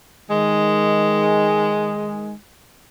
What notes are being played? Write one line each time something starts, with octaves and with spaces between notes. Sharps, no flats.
D#3 G#3